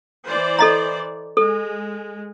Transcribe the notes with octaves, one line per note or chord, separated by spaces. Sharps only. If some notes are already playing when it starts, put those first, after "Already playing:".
E3 C5 D5
A4 D#5 A#5
G#3 A4